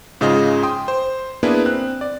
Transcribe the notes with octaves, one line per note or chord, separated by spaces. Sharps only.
G#2 C#3 F4 G#4 D#5
G5 C6 D#6
C5
A#3 B3 D4 E4 G#4 B4
C4 F#6
D5